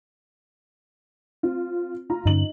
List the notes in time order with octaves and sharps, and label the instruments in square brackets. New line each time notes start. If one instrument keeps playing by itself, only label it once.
[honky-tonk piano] C4 F4
F4 A#5
[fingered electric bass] G2 D3 C#4 [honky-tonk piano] D#4 F#7